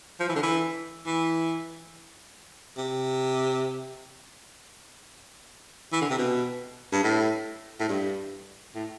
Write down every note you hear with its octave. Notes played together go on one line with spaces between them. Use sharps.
F3
E3
D3
E3
E3
C3
E3
D3
C3
B2
G2
A2
A2
G2
A2